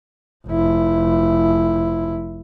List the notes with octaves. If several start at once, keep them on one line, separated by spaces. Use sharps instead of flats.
F1 E4